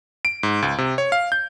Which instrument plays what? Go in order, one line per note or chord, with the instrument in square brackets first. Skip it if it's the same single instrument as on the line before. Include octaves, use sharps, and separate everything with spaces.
[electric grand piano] D7
G#2
C#2
C3
C#5
F5
G6